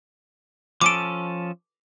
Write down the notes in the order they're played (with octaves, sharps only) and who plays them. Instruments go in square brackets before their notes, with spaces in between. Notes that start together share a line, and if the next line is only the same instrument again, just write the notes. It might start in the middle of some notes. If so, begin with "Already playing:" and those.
[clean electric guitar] F3 C#4 A4 [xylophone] D6 D7